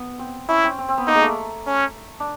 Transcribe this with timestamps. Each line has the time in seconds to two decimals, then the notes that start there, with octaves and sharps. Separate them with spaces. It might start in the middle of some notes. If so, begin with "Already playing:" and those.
Already playing: B3
0.19 C4
0.49 C#4 E4
0.64 C4
0.79 C4
0.89 C4
0.98 B3
1.08 A#3 D#4
1.15 G#3
1.22 A3
1.67 C#4
2.20 D4